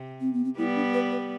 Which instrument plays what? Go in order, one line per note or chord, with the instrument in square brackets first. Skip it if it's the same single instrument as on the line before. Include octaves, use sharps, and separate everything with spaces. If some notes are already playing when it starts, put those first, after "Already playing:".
Already playing: [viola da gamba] C3
[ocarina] C4
B3
C4
[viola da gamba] G3 B3 [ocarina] E4
[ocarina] D4
B4
B4